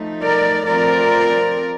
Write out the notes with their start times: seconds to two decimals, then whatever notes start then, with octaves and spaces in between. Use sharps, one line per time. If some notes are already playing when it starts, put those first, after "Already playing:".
Already playing: F3 A3 D#4
0.23 A#4 D5
0.67 F3 A3 C4 F4 A#4 D5